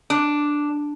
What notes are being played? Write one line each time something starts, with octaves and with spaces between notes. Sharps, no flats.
D4